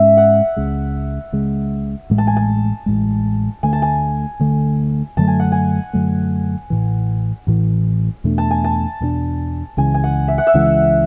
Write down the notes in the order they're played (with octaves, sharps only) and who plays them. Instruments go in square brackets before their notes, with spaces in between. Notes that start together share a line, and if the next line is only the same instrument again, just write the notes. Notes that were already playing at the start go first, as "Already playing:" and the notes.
Already playing: [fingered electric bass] G#2 G#3 C#4 [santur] E5
[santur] F#5
[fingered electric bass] C#2 C#3 G#3
C#2 C#3 G#3
A1 A2 G#3
[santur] A5
G#5
A5
[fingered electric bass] A1 A2 G#3
[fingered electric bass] D2 D3 A3 [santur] G#5
[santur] A5
G#5
[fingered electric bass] D2 D3 A3
[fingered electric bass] F#2 D3 F#3 A3 [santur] A5
[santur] G#5
F#5
G#5
[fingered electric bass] F#2 D3 F#3 A3
A1 A2 E3
A1 A2 E3
E2 B2 A3 D4
[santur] A5
G#5
A5
[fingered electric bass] E2 B2 A3 D4
[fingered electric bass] C#2 C#3 E3 G#3 [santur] G#5
[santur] G#5
F#5
E5
F#5
E5
[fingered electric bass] C#2 C#3 E3 G#3